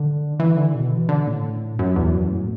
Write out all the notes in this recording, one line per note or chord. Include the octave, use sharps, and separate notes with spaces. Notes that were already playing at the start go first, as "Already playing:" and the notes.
Already playing: D3
E3
D3
B2
E3
D3
A2
F#2
E2
F#2
A2